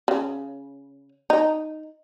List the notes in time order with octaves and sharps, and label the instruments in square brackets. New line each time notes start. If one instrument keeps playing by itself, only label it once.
[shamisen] C#3
D#4